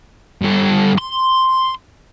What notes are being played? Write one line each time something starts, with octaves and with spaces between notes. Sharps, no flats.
G2 A4
C6